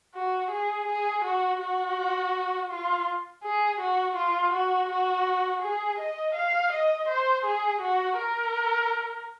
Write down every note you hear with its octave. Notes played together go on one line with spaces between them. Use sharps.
F#4
G#4
G#4
F#4
F#4
F4
G#4
F#4
F4
F#4
F#4
G#4
D#5
F5
D#5
C5
G#4
F#4
A#4